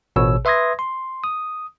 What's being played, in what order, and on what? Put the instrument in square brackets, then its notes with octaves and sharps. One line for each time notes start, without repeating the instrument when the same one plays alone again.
[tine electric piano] A1 B2 C#5 E6
B4 E5 C6 D#6 G#6 A#6
C6
D#6